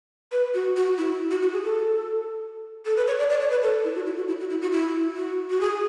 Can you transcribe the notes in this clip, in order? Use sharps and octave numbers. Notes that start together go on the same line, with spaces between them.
B4
F#4
F#4
E4
F#4
F#4
G#4
A4
A4
B4
C#5
D5
D5
C#5
B4
A4
E4
F#4
E4
F#4
E4
F#4
E4
F#4
E4
F#4
F#4
G#4